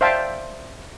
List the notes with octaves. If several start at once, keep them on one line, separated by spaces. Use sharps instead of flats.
C5 D5 E5 F5 G5 A5